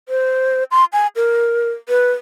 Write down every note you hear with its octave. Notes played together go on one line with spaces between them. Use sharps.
C5
C6
G#5
A#4
B4